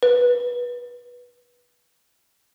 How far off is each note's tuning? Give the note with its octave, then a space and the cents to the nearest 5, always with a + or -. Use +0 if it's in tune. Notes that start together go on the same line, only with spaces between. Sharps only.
B4 -20